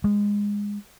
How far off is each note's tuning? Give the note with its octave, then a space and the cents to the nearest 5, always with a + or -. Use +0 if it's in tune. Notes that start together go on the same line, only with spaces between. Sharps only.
G#3 -20